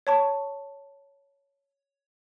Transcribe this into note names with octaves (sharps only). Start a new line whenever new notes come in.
C#5 A5 C#6